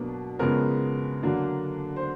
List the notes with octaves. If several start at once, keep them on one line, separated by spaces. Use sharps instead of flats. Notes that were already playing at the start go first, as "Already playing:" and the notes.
Already playing: B2 F#3 A#3 D4 B4
C#3 F3 G#3 B3 A#4
D3 F#3 A#3 D4
C5